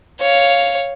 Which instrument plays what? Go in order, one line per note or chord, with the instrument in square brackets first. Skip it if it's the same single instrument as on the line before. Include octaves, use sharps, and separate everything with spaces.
[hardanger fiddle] C#5 F5